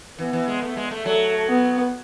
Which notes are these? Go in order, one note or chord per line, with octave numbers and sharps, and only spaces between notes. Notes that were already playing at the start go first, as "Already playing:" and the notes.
E3 B3
E3
G#3
A3
G#3
A3
F#3 A3
B3